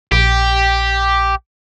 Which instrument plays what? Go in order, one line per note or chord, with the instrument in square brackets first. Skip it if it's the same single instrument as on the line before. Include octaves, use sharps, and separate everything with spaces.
[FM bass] A#1 [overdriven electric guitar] G4